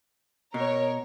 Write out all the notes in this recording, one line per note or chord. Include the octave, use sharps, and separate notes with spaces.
B2 A#4 C#5